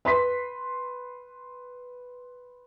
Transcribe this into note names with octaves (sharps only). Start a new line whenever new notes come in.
B4 C6 B6